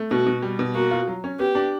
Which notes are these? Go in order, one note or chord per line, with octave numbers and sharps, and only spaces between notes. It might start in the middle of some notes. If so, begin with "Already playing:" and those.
Already playing: A3
B2 F#4
B2
G3
B2
A#3 F#4
F4
F#3
C#4
B3 G4
D4